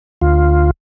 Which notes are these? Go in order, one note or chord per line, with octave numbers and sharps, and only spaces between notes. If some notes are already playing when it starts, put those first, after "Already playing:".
D2 F4